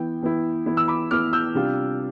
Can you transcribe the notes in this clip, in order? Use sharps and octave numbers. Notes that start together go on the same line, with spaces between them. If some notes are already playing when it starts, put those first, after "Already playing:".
Already playing: E3 B3 E4 G5
E3 B3 E4
E3 B3 E4
E6
B5 D6
E3 B3 E4 D6 F6
E6 G6
C3 G3 D4 F4